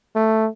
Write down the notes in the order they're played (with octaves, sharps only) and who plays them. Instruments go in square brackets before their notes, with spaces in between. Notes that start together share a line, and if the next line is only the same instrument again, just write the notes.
[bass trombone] A3